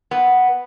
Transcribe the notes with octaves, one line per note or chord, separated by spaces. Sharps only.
B3